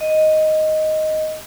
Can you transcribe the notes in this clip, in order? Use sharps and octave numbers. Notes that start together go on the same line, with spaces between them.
D#5